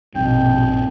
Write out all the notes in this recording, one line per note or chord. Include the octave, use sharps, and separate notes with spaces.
A#1 G2 B2 C4 G5